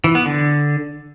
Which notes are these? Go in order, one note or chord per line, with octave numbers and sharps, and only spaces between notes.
E3
B3
D3